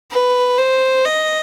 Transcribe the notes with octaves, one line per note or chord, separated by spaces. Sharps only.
B4
C5
D#5